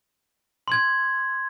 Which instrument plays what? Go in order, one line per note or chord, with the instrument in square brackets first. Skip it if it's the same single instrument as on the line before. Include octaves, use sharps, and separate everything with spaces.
[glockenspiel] C6 G#6